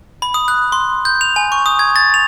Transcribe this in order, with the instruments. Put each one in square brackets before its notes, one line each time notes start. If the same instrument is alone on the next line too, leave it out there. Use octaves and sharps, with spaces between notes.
[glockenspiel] B5
D#6
F#6
C6
G6
F7
G#5
C#6
D#6
G#6
A6
F7